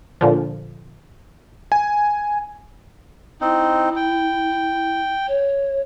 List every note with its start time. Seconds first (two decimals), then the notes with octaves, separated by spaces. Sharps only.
0.21 A#2 D3 F3
1.72 G#5
3.41 C4 D#4 E4
3.96 G5
5.28 C#5